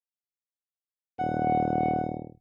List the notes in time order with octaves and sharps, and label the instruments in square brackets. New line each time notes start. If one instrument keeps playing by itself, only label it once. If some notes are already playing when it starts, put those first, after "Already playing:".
[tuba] D#1 [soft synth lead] F#5